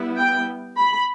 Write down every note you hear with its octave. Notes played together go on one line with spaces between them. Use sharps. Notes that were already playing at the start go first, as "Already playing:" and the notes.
Already playing: G3 B3 E4
G5
B5